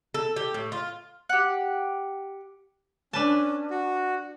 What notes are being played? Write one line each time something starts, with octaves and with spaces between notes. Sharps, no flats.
A4
G4
A2
F4
G4 F#5
C#4 D4 B4 A5
F#4